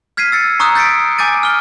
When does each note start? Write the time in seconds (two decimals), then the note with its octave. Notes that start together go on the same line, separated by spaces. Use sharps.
0.17 F6 G#6 B6 C7 D#7
0.32 E6 A6 C#7
0.60 A#5 C#6 D#6 E6 F#6
0.75 G6 A6 B6 C#7 D7
1.18 G#5 D6 G6 A6 D#7
1.43 F6 G7